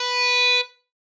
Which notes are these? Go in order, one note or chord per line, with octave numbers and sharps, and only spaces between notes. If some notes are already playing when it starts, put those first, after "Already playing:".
Already playing: B4